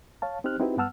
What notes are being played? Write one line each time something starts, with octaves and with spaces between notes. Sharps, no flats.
C#5 F5 A5
C4 D#4 G4 C5 F6 F#6
C4 D#4 E4 F#4 G4 B4
G2 B3 F#5 A5 E6 F6